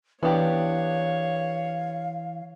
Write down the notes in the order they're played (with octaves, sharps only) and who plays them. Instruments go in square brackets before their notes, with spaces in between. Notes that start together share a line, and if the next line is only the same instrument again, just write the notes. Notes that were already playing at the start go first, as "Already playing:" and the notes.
[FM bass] E3 [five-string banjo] B3 D4 G4 [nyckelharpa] C#5 [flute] F5